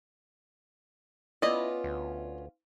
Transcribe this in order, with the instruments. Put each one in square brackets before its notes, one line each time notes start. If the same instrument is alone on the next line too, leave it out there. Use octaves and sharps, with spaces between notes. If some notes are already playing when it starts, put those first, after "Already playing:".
[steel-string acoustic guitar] B3 C#4 F4 [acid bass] E4 [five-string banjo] D5 D#5
[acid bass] D2